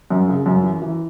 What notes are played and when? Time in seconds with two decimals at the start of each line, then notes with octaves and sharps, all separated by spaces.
0.10 F#2
0.28 C#3
0.46 F#2
0.64 E3
0.82 E3